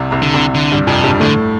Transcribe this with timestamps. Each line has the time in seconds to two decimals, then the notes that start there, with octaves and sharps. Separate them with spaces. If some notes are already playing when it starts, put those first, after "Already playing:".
Already playing: C2 C3
0.11 C2 C3
0.22 D3
0.34 C2 C3
0.54 D3
0.72 G2 G3
0.87 F2 C3 F3
1.04 G2 G3
1.20 A2 D3 A3